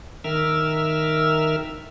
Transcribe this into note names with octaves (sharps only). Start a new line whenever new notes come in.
D#3 A#4 E5 E6 F6